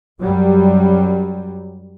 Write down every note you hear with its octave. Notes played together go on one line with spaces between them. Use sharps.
F#2 F#3 G3